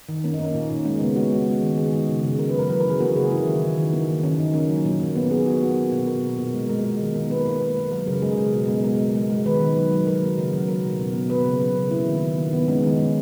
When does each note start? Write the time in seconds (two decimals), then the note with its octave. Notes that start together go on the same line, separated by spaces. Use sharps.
0.09 D#3
0.24 A#3 C#4
0.34 D#4
0.39 A#3
0.44 C#4
0.55 A#2
0.70 A#2
0.85 G#3 C#4
1.00 C#3 B3
1.16 G#3 F#4
1.31 G#3
1.47 G#3
1.62 D#3
1.77 D#3 G#4
1.93 G#3
2.08 C#3
2.23 C#3
2.39 C#3 A#4
2.49 B4
2.54 F#3 A#4
2.69 E3 B4
2.80 A#4
2.85 C#3
2.90 G#4
3.00 A#3 F#4
3.16 C#3 G#4
3.31 A#3 E4
3.47 D#3
3.62 D#3
3.77 D#3
3.93 A#3
4.08 D#3
4.23 D#3 C#4
4.38 D#3 D#4
4.54 A#3 C#4
4.69 F#3
4.85 A#2
5.00 A#3
5.15 A#2 B3
5.31 A#3 G#4
5.46 A#3 F#4
5.62 A#3
5.77 A#3
5.92 B2
6.07 A#3 A#4
6.23 B2
6.38 A#2
6.53 G#3
6.69 G#3 A#4
6.84 G#3
7.00 D#3
7.15 A#3
7.30 A#3 B4
7.46 A#3
7.61 A#3
7.77 A#3
7.92 F#3 A#4
8.07 C#3 A#4
8.22 G#3 G#4
8.38 B2
8.54 B2
8.69 G#3
8.84 G#3 A#4
8.99 G#3
9.15 G#3
9.30 G#3
9.46 D#3 B4
9.60 D#3
9.76 F#3
9.91 F#3
10.07 F#3 A#4
10.22 A#3
10.38 C#3
10.53 F#3
10.68 A#3 A#4
10.84 B2
10.99 B2
11.14 A#3
11.30 A#3 B4
11.45 C#3
11.60 F#3
11.76 C#3
11.91 A#3 E4
12.07 D#3
12.22 D#3
12.38 A#3
12.53 D#3 B3
12.68 G#3 C#4
12.84 D#3 D#4
12.99 G#3